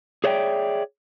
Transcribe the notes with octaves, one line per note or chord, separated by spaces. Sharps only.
G#4 C#5 D5 E5 G5